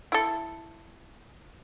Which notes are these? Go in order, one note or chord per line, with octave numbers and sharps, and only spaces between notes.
E4 A4